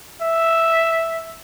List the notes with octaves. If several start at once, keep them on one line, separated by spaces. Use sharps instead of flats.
E5